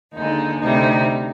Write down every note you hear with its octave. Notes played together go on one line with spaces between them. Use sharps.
D#2 D3 G#3 D#4
D2 C3 G3 D#4